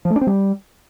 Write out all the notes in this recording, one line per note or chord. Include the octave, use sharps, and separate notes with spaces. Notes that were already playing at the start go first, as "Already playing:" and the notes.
F3
A3
D4
C4
G3